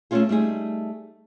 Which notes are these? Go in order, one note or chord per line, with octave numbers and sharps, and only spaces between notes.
A3 A#3 C4 C#4 F4 G#4
G3 A3 D#4 G#4